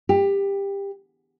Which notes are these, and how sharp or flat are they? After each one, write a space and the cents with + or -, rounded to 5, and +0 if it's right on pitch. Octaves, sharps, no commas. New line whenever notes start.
G4 +20